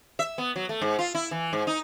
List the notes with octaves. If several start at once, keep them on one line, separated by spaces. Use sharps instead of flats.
E5
B3
F#3
A3
G#2
F4
E4
E3
G#2
D#4